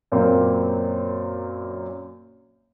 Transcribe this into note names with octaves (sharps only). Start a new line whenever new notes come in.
F#2 A#2 A#3 C4